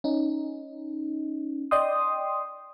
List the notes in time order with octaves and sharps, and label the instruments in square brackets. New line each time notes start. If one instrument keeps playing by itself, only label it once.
[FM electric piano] C#4 D#4
D5 D#5 G5 C6 D#6